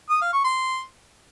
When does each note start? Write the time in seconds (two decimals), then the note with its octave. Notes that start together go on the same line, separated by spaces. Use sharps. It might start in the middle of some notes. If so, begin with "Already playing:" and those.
0.10 D#6
0.21 F5
0.33 C#6
0.44 C6